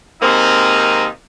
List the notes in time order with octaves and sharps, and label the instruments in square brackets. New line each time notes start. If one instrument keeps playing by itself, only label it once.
[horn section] C3 D#3 G#3 A#3 C4 D#4